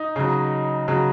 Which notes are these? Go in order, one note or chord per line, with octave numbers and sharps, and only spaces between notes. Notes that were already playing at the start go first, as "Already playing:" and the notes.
Already playing: D#4
C#3 F#3
C#3 F#3